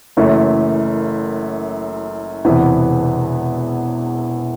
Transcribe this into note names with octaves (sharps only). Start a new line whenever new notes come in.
F#1 F#2 E3 A3
E1 E2 C3 E3 B3